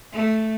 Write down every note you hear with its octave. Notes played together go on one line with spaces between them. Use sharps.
A3